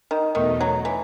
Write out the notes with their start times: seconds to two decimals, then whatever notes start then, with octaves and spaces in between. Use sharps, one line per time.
0.11 D#3
0.35 E2 B2 D#3 A3 D#4
0.61 F#3
0.85 E3